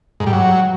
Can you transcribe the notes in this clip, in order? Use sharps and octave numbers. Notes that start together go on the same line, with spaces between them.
G#2
G3
F#3